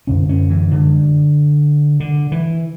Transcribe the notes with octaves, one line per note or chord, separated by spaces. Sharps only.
F#2 D3 C#4
C#4
E3
D3
D3
E3